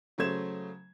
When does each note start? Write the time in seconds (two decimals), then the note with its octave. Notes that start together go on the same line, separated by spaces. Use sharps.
0.18 C#3 F#3 A3 C5 G#6 E7